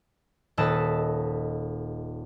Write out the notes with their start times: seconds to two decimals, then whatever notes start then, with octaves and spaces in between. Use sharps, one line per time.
0.57 D#1 A4 B4 D#5 A5 E7